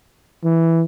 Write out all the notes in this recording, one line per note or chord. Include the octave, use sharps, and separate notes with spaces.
E3